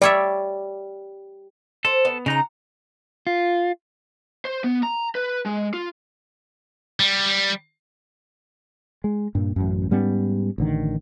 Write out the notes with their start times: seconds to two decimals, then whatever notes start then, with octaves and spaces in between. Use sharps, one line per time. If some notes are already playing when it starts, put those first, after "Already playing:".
0.02 G3 C#5 D5 E5
1.85 A4 C5
2.05 B3
2.26 C#3 D#4 F#5 A#5
3.27 F4
4.45 C5
4.64 B3
4.83 A#5
5.15 B4
5.46 G#3
5.73 F4
7.00 G3
9.04 G#3
9.35 G2 A#2
9.56 A1 F#2
9.91 G#2 G3 B3 C#4
10.58 A1 D3 D#3